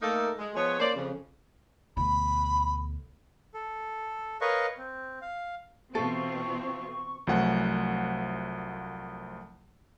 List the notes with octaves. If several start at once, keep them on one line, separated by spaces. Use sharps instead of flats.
A3 A#3 D#4 A4 A#4
G#3
F3 G#3 B3 C#5
A#3 C#4 C5 D5
F2 C#3
D2 B2 B5
A4
A#4 B4 C#5 D#5 F5 C#6
C4
F5
B2 E3 C4 F4 A4 C#6
C2 F3 F#3 A3 F#5 G#5